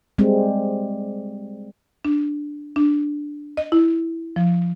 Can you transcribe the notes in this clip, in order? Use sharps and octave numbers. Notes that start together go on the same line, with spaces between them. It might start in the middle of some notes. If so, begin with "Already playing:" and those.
G3 G#3 C4
D4
D4
D#5
E4
F3